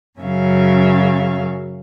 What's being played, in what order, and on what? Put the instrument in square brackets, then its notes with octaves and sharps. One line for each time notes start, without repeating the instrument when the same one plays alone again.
[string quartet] F#2 C#3 F#3 C#4 E5 F5